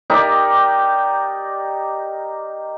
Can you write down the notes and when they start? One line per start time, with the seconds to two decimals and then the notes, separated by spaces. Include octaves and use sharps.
0.10 D#4 G4 A#4 D5